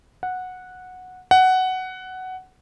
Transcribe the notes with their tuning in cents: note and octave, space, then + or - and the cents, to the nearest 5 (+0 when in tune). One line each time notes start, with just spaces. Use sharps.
F#5 -10
F#5 +10